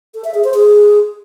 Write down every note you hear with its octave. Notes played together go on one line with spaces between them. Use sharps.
A4
E5
G#4
C5
G#4